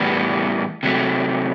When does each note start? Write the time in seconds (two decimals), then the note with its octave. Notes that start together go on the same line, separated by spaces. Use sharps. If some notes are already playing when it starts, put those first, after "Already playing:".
Already playing: A2 E3 G3 B3
0.83 C3 F#3 A3